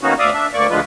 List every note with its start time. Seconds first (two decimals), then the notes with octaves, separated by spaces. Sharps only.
0.01 D#3 A#3 B3 C#4 D#4 F#4
0.19 D2 D5 E5 F5 D#6
0.34 D4 E5
0.53 D2 A#3 D5 C#6
0.70 D2 D3 F3 G#3 F4 B4